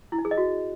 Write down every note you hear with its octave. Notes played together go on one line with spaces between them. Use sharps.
E4
D#4
G#4
D#5
F#4